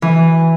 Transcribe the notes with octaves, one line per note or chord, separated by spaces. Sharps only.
E3